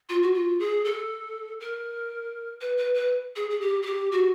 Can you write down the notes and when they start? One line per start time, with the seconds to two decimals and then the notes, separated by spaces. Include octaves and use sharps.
0.09 F4
0.22 F#4
0.34 F4
0.59 G#4
0.84 A4
1.60 A#4
2.61 B4
2.77 B4
2.94 B4
3.36 G#4
3.50 G#4
3.60 G4
3.82 G#4
3.86 G4
4.11 F#4